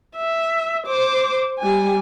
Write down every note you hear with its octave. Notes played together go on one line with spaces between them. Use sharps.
E5
C5 D6
G3 G#5